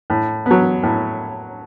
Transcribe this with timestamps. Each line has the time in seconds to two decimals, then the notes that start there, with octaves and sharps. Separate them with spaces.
0.10 A2
0.46 F#3 B3
0.83 A2